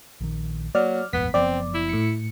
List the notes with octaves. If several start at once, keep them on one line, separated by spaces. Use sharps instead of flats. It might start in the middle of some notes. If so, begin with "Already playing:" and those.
A#1 D#3
F#3 A#3 D5 F6
D#1 G#1 F2 B3 B6
F#1 F3 B3 C4 D5
E4
A2 C#7